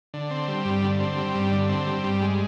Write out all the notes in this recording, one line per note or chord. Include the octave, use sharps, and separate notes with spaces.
D3
C4
G3
G2
D3
C4
G3
G2
D3
C4
G3
G2
G#3